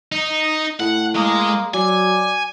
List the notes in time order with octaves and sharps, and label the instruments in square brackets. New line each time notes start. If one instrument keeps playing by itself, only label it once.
[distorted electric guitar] D#4
[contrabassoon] A2 [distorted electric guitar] F#5
[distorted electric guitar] G#3 D#5 [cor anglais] A#3
[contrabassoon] F#3 [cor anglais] D5 [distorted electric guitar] G#5